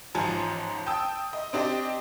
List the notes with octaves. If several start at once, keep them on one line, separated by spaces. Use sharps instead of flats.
A1 G#2 F3 G#5 A5
G5 A5 D#6 E6
D#5
C4 D4 G4 D#5